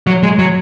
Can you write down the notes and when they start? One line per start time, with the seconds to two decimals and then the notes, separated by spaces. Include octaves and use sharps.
0.07 F#3
0.23 G#3
0.39 F#3